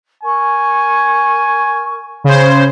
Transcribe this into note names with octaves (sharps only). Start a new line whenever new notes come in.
A#4 G#5 C#6
C#3 C5 C#5 B5